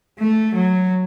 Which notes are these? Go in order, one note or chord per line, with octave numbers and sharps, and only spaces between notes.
A3
F#3